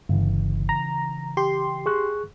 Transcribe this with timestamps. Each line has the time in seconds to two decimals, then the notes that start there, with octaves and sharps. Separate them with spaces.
0.09 G1 C#3 E3
0.69 A#5
1.37 G4 C6
1.86 G#4 C#6 F#6